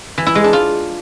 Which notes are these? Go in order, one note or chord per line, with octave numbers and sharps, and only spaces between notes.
E3
E4
G#3
D4
F4